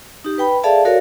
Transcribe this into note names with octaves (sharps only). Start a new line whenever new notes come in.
D#4 G4
B4 G5 B5
G#4 A4 D5 E5 F5 A5
F#4 A4 A#4 C#5 D5 F5